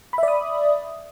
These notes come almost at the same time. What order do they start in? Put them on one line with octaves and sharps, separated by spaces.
B5 E5 D5 D#6